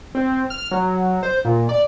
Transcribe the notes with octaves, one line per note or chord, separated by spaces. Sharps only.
C4
F6
F#3
C5
A#2
D5